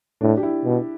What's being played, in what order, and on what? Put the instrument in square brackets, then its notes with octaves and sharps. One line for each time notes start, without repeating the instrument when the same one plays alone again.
[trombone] A2 [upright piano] D4
[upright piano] G4
E4
[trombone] B2